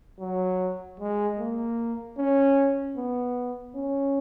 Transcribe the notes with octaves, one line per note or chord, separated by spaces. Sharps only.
F#3
G#3
A#3
C#4
B3
C#4